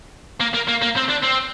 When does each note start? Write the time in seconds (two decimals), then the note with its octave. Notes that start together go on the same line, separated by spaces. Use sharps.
0.40 A#3
0.54 A#3
0.68 A#3
0.82 A#3
0.96 C4
1.09 D4
1.23 C4